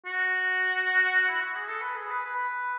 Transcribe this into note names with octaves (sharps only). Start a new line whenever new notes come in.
F#4
E4
F#4
G#4
A4
B4
G#4
B4
B4